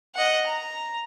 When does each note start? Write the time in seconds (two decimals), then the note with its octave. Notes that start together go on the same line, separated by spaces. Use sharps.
0.15 D#5 F#5
0.47 A#5